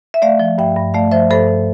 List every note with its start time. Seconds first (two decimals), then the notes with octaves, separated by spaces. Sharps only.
0.14 E5
0.22 A3 D5 F5
0.40 F3
0.58 G2 E5 G5
0.76 G2
0.94 A3 D5 F5
1.12 F3 C5 E5
1.30 G2 A4 C5
1.48 G2